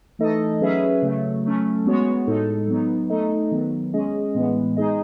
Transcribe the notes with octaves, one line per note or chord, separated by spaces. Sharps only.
E3 A3 D#4 A4 D#5
F#3 C#4 G#4 B4 E5
C#3 F#3 A3
F#3 A3 C#4
G#3 B3 F#4 C#5
A2 G#3 D#4 A4
F#3 B3 D#4
A3 D#4 A4 D#5
D#3 F#3 B3
G#3 C#4 G#4 D#5
A2 E3 G#3 B3
G#3 D#4 G#4 D#5